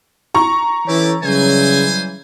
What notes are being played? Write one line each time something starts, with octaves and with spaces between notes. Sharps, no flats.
A#5 C#6
E3 C#4 E4 G4 A4 D6
C#3 E3 F#3 G3 C5 G#5